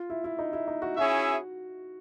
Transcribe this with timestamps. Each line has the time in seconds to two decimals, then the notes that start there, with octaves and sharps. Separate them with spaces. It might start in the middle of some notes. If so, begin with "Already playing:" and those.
Already playing: F4
0.10 E4
0.24 E4
0.39 D#4
0.53 E4
0.68 D#4
0.82 F#4
0.97 C#4 E4 F#4 G#4 C#5 E5